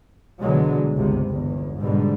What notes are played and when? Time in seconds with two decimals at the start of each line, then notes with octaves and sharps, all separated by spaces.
0.40 C2 B2 D3 E3 F#3 G#3
0.95 G1 C#2 G2 C3
1.25 G1 E2
1.79 G#2 B2 D3 G3